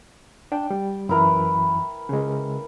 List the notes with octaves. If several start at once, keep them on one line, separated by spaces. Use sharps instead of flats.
D4 G5
G3
F#2 E3 E4 A#4 B4
C#3 G#3